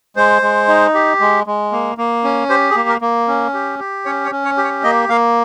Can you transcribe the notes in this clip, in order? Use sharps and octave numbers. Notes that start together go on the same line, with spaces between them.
G#3 C5
G#3
D#4
G4
G#3
G#3
A#3
A#3
C#4
G4 C5
G#4
A#3
A#4
A#3
C#4
G4
G4
C#4 C#5
C#5
C#4
C#5
G4
C#5
A#3 D#5
A#3 F5